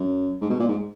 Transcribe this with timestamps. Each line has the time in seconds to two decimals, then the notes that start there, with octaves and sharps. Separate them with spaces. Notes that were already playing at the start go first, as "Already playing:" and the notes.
Already playing: F#2
0.41 G#2
0.50 B2
0.59 A#2
0.68 G#2